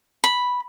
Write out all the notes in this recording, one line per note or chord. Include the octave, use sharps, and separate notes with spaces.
B5